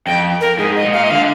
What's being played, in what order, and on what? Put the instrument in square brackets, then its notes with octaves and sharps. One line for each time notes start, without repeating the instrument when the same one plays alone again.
[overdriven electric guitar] F2 [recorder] G5
[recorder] A#4
[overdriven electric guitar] G#2 [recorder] G#4
[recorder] D#5
[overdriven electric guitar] A#2
[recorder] F5
D#5
[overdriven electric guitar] D3 [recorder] F5